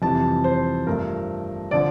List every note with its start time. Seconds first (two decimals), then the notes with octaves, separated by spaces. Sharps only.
0.02 F2 C3 E3 G3 A5
0.44 C5
0.86 G2 F3 A3 A#4
1.71 D3 F3 D5